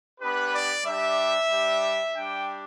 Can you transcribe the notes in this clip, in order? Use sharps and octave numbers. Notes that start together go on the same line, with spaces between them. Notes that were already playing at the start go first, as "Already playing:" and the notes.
B3 D4 G4 B4
D5
G3 D4 G4 E5
G3 D4 G4
G3 D4 G4 G5